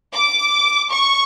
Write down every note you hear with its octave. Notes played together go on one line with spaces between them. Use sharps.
D6
C#6